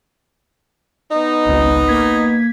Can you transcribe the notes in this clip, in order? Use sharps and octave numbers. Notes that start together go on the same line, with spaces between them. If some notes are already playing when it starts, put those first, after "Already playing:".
B3 D#4
G#1 C#2
A#3 G#6 B6